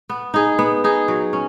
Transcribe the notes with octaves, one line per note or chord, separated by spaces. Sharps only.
B3
D#4 G#4
B3
D#4 G#4
F#3
C#4